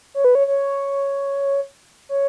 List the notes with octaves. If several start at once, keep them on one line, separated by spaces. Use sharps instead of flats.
C#5
B4
C#5
C#5
C#5